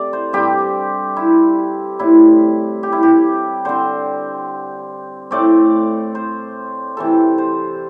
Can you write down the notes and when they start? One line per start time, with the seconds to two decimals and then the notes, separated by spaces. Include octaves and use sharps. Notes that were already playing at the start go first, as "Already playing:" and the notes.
Already playing: C3 A3 D5
0.13 C5
0.33 G2 G3 C4 G4
1.17 E4
1.99 A2 G3 C4 E4
2.83 G4
2.92 E4
3.03 G4
3.65 D3 C4 C5
5.31 A2 A3 C4 D5
6.15 C5
6.97 C3 E3 C4 A4
7.38 C5